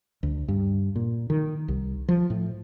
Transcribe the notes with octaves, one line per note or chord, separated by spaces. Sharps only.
D2
G2
A#2
D#3
C2
F3
A2